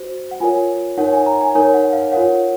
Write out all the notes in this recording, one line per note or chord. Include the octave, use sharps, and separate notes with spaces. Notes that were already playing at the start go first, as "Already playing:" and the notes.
Already playing: F#4 C5
F#5
F4 A#4 C#5 G#5
D#4 A#4 C#5 F#5
G#5
A#5
G#5
D#4 A#4 C#5 G#5
F#5
F5
F4 A#4 C#5 F#5